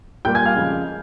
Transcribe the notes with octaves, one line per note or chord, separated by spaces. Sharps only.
A#2 G3 A#3 G5 G6
G#5 G#6
F5 F6
F2 C#3 G#3